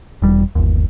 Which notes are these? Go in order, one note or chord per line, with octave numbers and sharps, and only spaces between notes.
E1 G3
G1 D#2